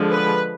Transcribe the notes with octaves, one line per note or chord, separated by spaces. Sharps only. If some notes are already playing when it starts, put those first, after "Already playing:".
Already playing: D3 F3 G#3
B4